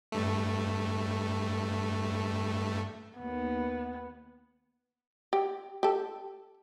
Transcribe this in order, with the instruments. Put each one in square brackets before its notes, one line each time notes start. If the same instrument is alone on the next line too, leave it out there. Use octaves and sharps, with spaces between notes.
[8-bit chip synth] G2 A3
[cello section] D#2 [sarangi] B3
[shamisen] G4
G4 A4